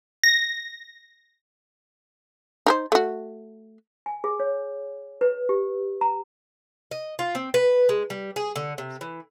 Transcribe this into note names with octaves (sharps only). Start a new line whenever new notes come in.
A#6
D#4 A#4 C5
A3 F#4
G#5
G#4
C#5
B4
G4
A#5
D#5
F4
C4
B4
G#3
G3
G#4
D3
C3
E3